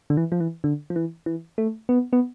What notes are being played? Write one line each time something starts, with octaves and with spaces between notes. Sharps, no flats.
D3
E3
F3
E3
D3
F3
E3
E3
A3
B3
B3